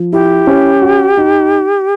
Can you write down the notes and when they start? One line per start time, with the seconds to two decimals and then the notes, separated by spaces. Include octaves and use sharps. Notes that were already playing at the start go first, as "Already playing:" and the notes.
Already playing: F3
0.13 E4 G4
0.47 C#4
0.82 F#4
1.17 D#4